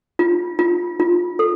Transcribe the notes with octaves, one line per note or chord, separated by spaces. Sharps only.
F4
F4
F4
A4